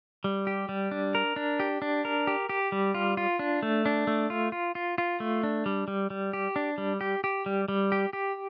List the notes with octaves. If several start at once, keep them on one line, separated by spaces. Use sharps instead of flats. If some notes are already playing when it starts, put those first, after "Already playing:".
G3
G4
G3
D4
A#4
D4
G4
D4
A#4
G4
G4
G3
F4
F4
D4
A3
D4
A3
F4
F4
F4
F4
A3
D4
G3
G3
G3
G4
D4
G3
G4
G4
G3
G3
G4
G4